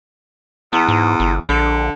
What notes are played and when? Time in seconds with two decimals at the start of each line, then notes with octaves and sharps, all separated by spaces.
0.73 E2 B3
0.88 G#2
1.20 G1
1.49 A#1 D3